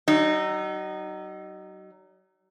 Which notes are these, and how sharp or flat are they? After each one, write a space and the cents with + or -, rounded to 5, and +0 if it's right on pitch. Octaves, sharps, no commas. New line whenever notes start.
F#3 +40 D#4 -15